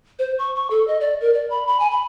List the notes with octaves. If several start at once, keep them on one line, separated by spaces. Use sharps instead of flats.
C5
C#6
C#6
A4
D#5
D5
A#4
D5
B5
B5
G#5
B5